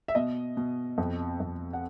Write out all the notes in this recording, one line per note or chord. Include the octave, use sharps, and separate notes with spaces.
E5
B2 D#5
B2
F2
F2
F#5